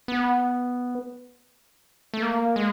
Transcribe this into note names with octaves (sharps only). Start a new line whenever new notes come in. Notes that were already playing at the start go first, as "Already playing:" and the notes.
B3
A3
A#3
G#3